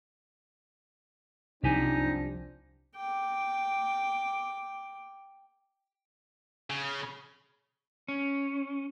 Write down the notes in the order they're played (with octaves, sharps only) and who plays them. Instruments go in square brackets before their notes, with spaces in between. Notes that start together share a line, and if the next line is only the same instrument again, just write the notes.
[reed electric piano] C2 [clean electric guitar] F#2 G4 G#5 [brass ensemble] F3 C4 D4 [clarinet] D#4
[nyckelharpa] G5 D6
[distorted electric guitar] C#3
[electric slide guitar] C#4